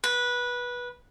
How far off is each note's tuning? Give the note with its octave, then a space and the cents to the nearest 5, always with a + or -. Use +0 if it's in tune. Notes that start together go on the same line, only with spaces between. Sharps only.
B4 -15